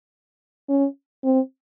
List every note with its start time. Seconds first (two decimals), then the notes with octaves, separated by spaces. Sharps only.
0.69 C#4
1.24 C4